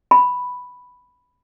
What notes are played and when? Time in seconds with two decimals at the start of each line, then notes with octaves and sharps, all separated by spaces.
0.11 B5